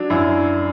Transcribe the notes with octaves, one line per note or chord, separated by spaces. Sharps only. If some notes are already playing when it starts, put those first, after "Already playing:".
Already playing: F#3 D4
F#2 E4